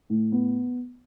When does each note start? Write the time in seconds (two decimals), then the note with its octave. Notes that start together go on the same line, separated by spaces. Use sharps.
0.10 A2
0.32 B3